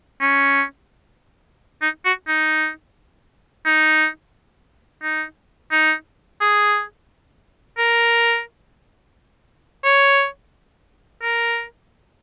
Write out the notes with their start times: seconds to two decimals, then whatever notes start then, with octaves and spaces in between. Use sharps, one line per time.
0.21 C#4
1.82 D#4
2.05 F#4
2.28 D#4
3.66 D#4
5.03 D#4
5.72 D#4
6.41 G#4
7.78 A#4
9.84 C#5
11.22 A#4